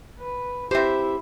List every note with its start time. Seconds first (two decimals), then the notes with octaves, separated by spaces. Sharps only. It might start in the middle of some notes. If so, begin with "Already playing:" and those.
0.19 B4
0.71 C4 E4 G4 C5 E5